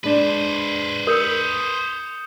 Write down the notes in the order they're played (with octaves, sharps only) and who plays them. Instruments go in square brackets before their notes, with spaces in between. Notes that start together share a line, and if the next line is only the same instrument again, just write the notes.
[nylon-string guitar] G#3 D4 [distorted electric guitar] B4 C5
[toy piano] A#4 [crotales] D#6 G6 C#7